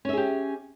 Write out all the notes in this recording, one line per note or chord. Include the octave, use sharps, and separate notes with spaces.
C#4 G4 G#4 E5